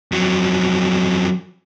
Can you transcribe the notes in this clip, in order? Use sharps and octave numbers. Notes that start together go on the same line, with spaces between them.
F2 F#3